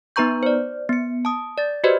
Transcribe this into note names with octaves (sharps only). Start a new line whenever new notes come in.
B3 D#4 B4 A#5 C#6 G6
C5 D5
B3 C#7
A5 D#6
D5 A6
F#4 G4 B4 C5 D5 D#5